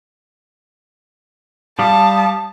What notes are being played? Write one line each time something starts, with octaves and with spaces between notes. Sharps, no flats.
G3 F5 A5 D#6